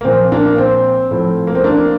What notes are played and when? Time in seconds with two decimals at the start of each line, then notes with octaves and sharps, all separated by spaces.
0.01 A#3
0.05 A#2 F3 C4
0.32 A#3 D4
0.58 C4
1.11 A2 F3
1.47 A#3
1.55 C4
1.64 A#3 D4